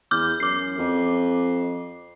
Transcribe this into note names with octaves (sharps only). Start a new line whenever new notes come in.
E2 D6 F6 G6
F#2 D6 C7
F2